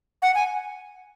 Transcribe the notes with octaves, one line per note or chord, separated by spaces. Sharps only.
F#5
G#5